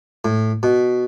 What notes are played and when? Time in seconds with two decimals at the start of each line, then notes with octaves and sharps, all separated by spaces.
0.25 A2
0.63 B2